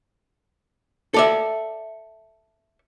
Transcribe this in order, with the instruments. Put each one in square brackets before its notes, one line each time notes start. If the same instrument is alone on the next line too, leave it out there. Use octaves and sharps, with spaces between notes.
[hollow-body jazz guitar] A4 D5 E5